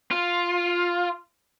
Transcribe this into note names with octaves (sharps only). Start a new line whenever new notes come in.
F4